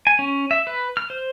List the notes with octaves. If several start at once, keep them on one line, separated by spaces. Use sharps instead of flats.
G#5
C#4
E5
B4
F6
C5